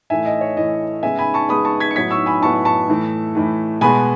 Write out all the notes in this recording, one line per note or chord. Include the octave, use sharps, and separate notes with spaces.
A2 E3 A3 E5 G#5
D#5
C#5
A2 E3 A3 D#5
C#3 G#3 B3 E5 G#5
G#5 B5
A5 C#6
C#3 G#3 B3 B5 D#6
A5 C#6
G#6 B6
C#7
A2 F#3 B3 G#6 B6
C#6 E6
G#5 B5
A2 F#3 B3 A5 C#6
A5 C#6
A2 E3 A3
A2 E3 A3
B2 G#3 B3 G#5 B5